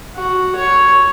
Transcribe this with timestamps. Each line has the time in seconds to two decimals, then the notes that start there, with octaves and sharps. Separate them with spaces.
0.16 F#4
0.56 C#5